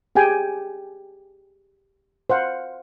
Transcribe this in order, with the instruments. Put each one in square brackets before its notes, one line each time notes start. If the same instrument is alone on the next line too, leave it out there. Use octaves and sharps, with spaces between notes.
[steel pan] G4 G#4 G5 G#5
C5 F5 F#5